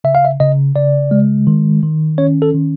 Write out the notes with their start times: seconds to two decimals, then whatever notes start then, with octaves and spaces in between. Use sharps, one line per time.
0.04 C#3 E5
0.15 F5
0.25 E5
0.40 C#3 D#5
0.75 C#3 D5
1.11 G#3
1.47 D#3
1.83 D#3
2.18 C#4 C#5
2.42 A4
2.54 D#3